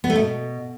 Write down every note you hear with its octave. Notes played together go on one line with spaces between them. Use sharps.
B3
A3
B2